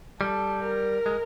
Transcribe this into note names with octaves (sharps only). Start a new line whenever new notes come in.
G3 A4
A#4
G#3